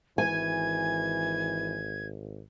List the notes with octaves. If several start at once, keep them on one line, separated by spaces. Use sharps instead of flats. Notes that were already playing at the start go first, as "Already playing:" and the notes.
G#1 E3 G#5 G#6